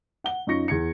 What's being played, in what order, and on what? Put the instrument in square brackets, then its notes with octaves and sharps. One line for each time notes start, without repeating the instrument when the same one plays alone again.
[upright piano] F#5 G7
F#2 D#4 F4 C#6 A#6 C#7
E2 G#6 C#7